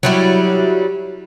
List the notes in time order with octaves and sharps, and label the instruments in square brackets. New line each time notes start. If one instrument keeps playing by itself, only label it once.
[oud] F#3 G3 E4